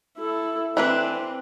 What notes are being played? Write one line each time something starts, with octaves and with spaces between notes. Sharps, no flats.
E4 A4
E3 C4 D4 B4